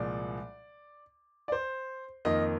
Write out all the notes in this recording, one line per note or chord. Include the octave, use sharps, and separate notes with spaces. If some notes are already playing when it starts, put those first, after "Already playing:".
Already playing: C2 A#2 F3 G#3 D5
D5
C5
F2 D#3 A#3 D#5